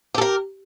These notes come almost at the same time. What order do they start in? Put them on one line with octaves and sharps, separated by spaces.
G4 A4 A#4